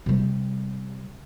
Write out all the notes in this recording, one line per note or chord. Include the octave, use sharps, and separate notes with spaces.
C3 G3